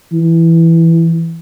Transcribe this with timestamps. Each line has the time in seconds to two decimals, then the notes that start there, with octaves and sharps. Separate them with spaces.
0.13 E3